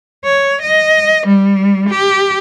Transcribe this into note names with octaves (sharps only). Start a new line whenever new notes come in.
C#5
D#5
G3
G4